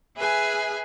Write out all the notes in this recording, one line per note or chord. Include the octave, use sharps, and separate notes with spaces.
G#4 B4 E5 G#5